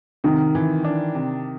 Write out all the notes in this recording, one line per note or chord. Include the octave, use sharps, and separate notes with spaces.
C3 D#3
E3
D4
C3